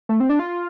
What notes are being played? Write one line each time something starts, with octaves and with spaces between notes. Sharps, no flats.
A3
C4
D4
F4